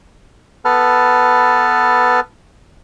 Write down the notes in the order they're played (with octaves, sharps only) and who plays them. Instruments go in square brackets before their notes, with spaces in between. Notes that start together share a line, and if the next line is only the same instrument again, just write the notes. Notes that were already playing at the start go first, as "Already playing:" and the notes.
[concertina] B3 A4 B4 A5 F6